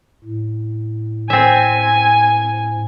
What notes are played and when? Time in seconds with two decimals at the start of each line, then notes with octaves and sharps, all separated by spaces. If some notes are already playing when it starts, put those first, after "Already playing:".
0.24 A2
1.30 C4 E5 G#5